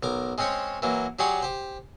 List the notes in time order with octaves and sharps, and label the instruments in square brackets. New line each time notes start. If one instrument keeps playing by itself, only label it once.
[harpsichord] B1 A#4 D6
G#3 C4 C#4 C5 C#5
E3 F#3 A#3
F#3 G4 G#4 C#5 D5 C6
G4 C5